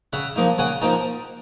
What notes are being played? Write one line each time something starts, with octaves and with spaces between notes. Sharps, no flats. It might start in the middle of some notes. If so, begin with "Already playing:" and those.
C#3 E5 F#5
F3 A#3 D#4
C#3 F#5 G#5
F3 A#3 D#4 G5 A5